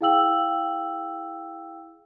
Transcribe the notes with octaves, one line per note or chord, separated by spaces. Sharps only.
E4 G#4 F5 G5 E6 F#7